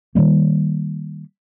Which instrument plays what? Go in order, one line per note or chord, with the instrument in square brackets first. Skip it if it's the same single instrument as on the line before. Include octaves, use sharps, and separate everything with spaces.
[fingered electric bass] D#3 E3 G3 A#3